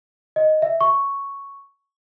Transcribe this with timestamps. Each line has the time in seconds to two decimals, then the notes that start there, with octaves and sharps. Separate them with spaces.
0.36 D#5
0.62 E5
0.81 C#6